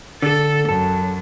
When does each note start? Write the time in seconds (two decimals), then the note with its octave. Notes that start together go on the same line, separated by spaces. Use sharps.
0.22 D3 A4
0.69 F#2 A4